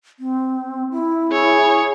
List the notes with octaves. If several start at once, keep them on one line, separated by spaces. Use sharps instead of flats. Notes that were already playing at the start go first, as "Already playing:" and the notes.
C4
E4
G#4 C#5